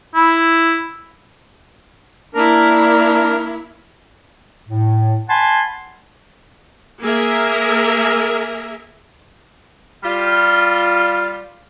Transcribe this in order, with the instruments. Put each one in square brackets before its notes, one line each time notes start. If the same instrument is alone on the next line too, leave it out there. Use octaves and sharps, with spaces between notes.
[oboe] E4
[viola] A#3 E4 [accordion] D4 A#4 A#5
[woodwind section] A2
F#5 G#5 A5 B5 C6
[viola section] A#3 G#4 A#4 E5
[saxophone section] G3 F4